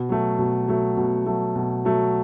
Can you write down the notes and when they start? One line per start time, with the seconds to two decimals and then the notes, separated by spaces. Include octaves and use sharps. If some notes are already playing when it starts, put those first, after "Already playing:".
Already playing: B2
0.09 F#3 A3
0.39 B2
0.68 F#3 A3
0.97 B2
1.26 F#3 A3
1.56 B2
1.85 F#3 A3